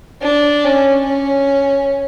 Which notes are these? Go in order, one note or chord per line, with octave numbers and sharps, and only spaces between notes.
D4
C#4
C#4